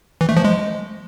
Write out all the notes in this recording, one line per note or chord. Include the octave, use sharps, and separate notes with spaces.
E3
A3
F3
G#3